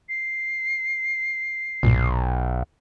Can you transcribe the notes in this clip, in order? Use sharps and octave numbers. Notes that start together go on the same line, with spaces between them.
C7
B1 G2 A#2